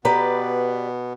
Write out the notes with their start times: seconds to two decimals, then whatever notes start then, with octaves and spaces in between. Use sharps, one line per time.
0.05 B2 B3 G4 B4 D5 A#5